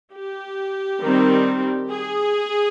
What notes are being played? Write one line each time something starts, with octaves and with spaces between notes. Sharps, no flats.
G4
D#3 G3 C4
G#4